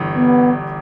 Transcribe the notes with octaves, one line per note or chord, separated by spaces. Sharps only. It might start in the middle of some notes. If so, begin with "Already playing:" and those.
Already playing: G1 G2 E3
B3